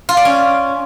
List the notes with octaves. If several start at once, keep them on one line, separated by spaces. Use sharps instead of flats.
F4
D5
C#4